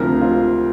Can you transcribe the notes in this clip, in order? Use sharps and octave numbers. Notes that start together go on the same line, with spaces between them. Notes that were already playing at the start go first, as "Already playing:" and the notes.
Already playing: D2 C3 F3 A#4
F4